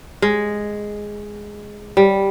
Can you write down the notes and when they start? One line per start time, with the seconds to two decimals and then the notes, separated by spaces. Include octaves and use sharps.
0.22 G#3
1.97 G3